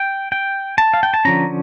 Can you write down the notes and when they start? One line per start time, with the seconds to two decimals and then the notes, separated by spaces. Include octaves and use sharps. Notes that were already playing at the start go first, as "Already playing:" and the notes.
Already playing: G5
0.32 G5
0.78 A5
0.94 F5
1.03 G5
1.14 A5
1.25 D3 F3 C#4 A#5